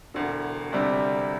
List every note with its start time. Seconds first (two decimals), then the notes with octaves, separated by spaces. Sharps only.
0.14 E1 D2 D3
0.72 D2 C3 G3 D4